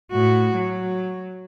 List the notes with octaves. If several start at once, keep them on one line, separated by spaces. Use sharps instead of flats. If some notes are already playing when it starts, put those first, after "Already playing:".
A2 F#4
F#3